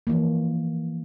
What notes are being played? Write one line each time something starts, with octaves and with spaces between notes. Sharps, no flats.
E3 F3 A#3